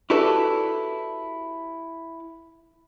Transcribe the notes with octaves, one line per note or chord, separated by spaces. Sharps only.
E4 F#4 G4 A4 B4 D5